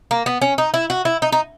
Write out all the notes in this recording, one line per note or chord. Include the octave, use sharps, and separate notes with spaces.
A#3
B3
C#4
D#4
E4
F#4
E4
D#4
D#4